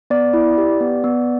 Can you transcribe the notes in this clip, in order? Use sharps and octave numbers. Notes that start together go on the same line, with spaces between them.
B3 D5
E4
G4
B3
B3